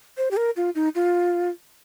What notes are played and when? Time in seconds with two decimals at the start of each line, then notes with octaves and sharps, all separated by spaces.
0.17 C5
0.31 G4
0.37 A#4
0.57 F4
0.75 D#4
0.95 F4